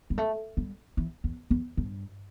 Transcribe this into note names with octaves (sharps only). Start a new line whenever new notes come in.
G3
A3
G3
E3
E2
E2
G2